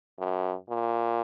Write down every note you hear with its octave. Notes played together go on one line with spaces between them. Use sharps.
F#2
A#2